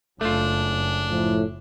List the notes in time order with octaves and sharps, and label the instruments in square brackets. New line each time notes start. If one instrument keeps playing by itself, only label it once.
[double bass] F#1 F#2 [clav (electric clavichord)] A3 F4 [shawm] D4
[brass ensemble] A2 F3